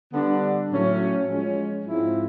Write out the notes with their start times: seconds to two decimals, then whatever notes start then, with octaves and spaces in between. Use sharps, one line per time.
0.12 D3 G3 B3 D4
0.70 A2 F#3 A3 C#4
1.26 F3 G#3 C#4
1.84 G#2 F3 G#3 C4 E4